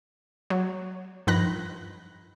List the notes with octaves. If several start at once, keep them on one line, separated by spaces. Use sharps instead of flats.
F#3
G2 D#3 F3 B5 F#6 A#6